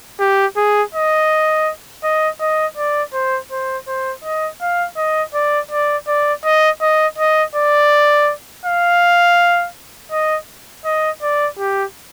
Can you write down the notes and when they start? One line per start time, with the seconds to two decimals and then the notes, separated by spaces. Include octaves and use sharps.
0.20 G4
0.57 G#4
0.95 D#5
2.04 D#5
2.41 D#5
2.77 D5
3.14 C5
3.52 C5
3.88 C5
4.24 D#5
4.62 F5
4.97 D#5
5.34 D5
5.71 D5
6.08 D5
6.45 D#5
6.82 D#5
7.18 D#5
7.55 D5
8.66 F5
10.12 D#5
10.85 D#5
11.22 D5
11.59 G4